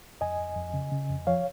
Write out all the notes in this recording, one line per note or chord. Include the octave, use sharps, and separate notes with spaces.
F2 D#5 G#5
F2
F2
C#3
C#3
F2
F3 C#5 F5